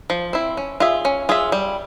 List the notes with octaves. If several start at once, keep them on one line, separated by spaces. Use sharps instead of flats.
F3
C4 E4
C#4
F4 G#4 E5
C#4
F4 G#4 E5
G3